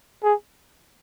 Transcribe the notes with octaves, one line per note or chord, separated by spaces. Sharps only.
G#4